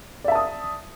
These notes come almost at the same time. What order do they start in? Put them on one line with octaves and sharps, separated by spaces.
D5 E5 A5 D#6